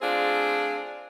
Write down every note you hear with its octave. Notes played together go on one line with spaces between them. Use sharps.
A3 C4 D4 F4 G#4